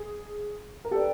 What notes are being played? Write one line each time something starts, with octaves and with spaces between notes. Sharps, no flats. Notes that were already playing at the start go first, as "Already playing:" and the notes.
Already playing: G#4
A#4
G4 A4 B4 D5 G5